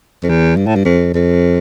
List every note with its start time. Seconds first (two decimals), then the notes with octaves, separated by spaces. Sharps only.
0.23 F2
0.29 E2
0.56 G2
0.66 A2
0.76 G2
0.85 F2
1.14 F2